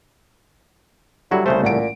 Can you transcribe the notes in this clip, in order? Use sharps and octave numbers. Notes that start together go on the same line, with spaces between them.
D3 F#3 G3 E4 F#4
C2 C#3 A3 C5
A1 A#2 F#5 D7